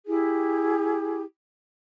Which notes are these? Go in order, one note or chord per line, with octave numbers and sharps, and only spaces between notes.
E4 G4 G#4